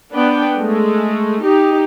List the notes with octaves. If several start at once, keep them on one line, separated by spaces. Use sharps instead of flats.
B3 D4 B4 G5
G#3 A3
D#4 G4